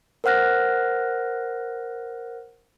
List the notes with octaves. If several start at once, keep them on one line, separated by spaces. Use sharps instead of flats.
A#4 C5 F#5 F6 F#6 A#6